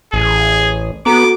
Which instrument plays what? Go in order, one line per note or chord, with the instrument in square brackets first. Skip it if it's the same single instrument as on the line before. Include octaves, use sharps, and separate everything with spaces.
[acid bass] A1 [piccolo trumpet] G#4
[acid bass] B3 [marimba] F#4 A4 A#5 [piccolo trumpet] D6